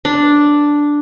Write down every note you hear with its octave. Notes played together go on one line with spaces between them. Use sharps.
D4